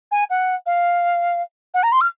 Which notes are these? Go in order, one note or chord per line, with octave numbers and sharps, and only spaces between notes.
G#5
F#5
F5
F#5
A#5
C6
F6